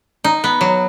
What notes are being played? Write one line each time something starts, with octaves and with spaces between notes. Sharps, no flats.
D#4
B3
F#3